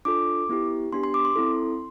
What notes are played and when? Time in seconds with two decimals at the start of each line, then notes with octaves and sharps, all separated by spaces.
0.05 D4 F4 A4 D6
0.49 B3 E4 G4
0.93 B3 D4 G4 C6
1.04 C6
1.14 D6
1.25 C6
1.36 C4 E4 A4